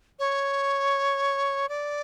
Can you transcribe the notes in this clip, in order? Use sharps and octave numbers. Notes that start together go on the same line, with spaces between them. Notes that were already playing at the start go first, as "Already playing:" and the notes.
C#5
D5